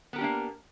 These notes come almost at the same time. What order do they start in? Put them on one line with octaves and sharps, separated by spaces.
B3 A#4 G4 D4 A#3